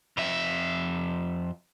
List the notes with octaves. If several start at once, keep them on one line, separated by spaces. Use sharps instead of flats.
F2 E5